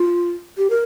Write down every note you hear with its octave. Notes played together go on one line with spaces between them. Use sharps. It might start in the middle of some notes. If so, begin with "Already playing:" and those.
Already playing: F4
G4
A#4